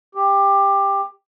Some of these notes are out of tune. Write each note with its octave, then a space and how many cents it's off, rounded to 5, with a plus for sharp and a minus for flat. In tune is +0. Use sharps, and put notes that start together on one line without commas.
G4 +15